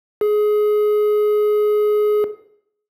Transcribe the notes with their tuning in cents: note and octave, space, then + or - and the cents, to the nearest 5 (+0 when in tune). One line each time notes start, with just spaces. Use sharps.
G#4 +20